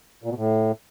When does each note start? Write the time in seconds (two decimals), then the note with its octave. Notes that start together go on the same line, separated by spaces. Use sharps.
0.24 A#2
0.30 B2
0.36 A2